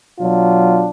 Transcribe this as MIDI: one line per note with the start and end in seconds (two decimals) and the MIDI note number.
0.19 0.90 47
0.19 0.90 54
0.19 0.90 62
0.19 0.90 65